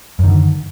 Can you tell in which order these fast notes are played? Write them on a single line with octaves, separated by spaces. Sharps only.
F#2 D#3 D3